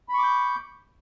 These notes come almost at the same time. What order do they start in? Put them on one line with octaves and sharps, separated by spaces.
B5 C#6 D6 G6